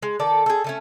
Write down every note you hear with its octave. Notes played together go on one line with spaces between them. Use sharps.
G#3
D#3 A4 D5
G#4 A4
D3 A3 C#4